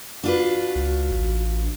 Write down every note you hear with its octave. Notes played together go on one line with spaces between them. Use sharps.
D4 F4 F#4 B4
C#2
A1